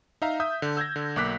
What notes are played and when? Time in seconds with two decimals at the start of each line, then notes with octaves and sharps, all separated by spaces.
0.22 D#4 E5 F5 A#5
0.40 E5 D#6 G6
0.62 D3
0.77 E6 G6 G#6 A#6
0.96 D3
1.16 B1 A#3 D6 F#6 B6